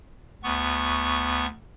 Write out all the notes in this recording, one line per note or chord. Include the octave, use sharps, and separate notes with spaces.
D2 B3 C#6